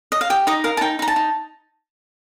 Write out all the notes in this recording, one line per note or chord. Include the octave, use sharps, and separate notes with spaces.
D#5
F5
G4 G5
D#4 D#5
A#4 F5
A5
D#4 G5
D#4 A#5
A5
D#4